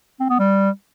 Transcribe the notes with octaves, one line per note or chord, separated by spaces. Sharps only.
C4
B3
G3